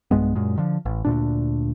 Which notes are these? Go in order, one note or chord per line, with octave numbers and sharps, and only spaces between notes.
B1 G2 G#3 B3
F#2 A#2 G#3
D3 F3
A1
D2 A#2 D4